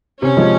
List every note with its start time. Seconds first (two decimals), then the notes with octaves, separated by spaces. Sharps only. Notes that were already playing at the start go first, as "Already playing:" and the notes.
0.22 C3 C#4
0.37 F3 G#3